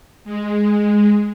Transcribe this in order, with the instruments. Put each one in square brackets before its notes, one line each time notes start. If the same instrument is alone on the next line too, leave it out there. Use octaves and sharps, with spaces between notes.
[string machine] G#3